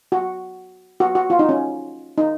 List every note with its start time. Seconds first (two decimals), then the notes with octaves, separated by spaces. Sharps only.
0.12 F#4
1.00 F#4
1.15 F#4
1.30 F4
1.39 D#4
1.49 C#4
2.18 D#4